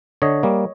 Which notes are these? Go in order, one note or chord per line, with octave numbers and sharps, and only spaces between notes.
D3 C#5 D#5
G3 A#3